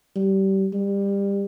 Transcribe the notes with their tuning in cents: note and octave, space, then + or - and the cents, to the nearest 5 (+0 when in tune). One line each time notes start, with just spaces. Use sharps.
G3 -25
G3 +25